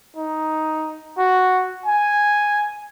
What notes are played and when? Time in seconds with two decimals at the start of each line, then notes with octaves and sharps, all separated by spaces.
0.17 D#4
1.18 F#4
1.86 G#5